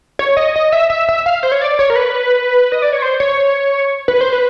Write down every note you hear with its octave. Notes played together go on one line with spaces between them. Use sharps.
C#5
D#5
D#5
E5
E5
E5
F5
C5
C#5
D5
C#5
A#4
B4
D#5
D5
C#5
C5
C#5
B4
C5
B4